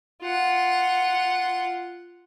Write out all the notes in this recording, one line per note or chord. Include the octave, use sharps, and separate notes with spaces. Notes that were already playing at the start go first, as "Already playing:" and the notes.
F4 F#5